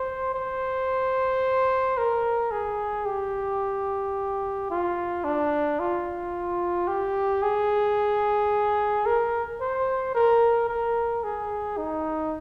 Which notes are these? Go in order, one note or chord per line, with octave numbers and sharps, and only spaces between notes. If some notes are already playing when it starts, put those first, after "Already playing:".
Already playing: C5
C5
A#4
G#4
G4
F4
D4
F4
G4
G#4
A#4
C5
A#4
A#4
G#4
D#4